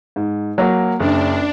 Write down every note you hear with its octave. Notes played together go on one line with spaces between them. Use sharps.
G#2
F#3 A#3
F#1 D4